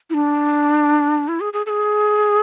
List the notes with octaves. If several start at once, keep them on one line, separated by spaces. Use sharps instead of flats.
E4
D4
E4
G#4
G#4
A4
G#4